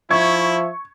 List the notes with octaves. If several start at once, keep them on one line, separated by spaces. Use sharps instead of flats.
F3 E4 E5 C#6 G#6